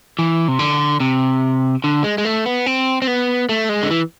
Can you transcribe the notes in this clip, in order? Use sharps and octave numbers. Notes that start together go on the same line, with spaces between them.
E3
C3
D3
C3
D3
G#3
G#3
A3
B3
C4
C4
B3
A3
G#3
D3
E3